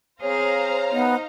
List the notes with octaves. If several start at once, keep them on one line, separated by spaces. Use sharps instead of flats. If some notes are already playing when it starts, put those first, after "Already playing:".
C4 G#4 C5 C#5 F5 A#5
B3 D#4